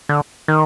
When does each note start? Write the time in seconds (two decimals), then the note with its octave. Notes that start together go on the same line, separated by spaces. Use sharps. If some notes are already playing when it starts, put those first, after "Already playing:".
0.09 D3
0.48 D#3